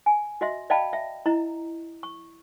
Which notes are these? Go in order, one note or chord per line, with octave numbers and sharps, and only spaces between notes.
G#5
F#4 D#5 E5 C6
D5 D#5 F5 G5 A5 B5
E5
E4 D#5 A#5
C#6